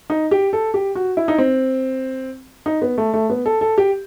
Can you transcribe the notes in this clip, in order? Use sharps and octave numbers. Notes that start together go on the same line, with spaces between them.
D#4
G4
A4
G4
F#4
E4
D#4
C4
D#4
B3
A3
A3
B3
A4
A4
G4